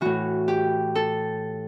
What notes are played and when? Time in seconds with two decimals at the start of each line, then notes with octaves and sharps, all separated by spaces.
0.01 A2 E3 F#4
0.48 G4
0.95 A4